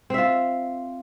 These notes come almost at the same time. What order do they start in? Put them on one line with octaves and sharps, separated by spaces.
C4 E5 F4